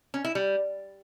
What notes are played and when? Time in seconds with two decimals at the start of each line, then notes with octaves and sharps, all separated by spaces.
0.14 C#4
0.25 E4
0.35 G3